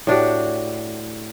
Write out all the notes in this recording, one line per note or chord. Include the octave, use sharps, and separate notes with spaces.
A2 D4 F#4 G4